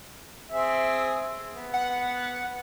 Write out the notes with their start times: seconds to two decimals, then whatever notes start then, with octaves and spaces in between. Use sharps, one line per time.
0.51 C4 G#4 E5
1.52 B3
1.74 F#5